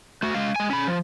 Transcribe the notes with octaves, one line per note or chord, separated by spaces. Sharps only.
A3 F#4
G#3 F5
G#3 G#5
C#4 B5
F3